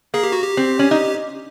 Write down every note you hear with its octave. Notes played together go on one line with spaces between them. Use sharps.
A#3 G#4
G4
F#4
G4
C4
C#4
D#4